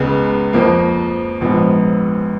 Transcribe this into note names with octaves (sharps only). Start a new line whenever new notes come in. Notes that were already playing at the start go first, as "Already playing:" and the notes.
Already playing: C#2 C#3 G#3 B3 B4
F2 F3 A#3
A#1 G#2 F3 B3